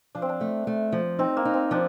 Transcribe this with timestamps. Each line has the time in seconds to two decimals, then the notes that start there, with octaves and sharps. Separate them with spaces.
0.15 F3 D4
0.22 C4
0.29 D4
0.41 A3
0.67 A3
0.92 F3
1.19 C4 D#4
1.37 A#3
1.45 D#4
1.54 C4
1.71 F3 D4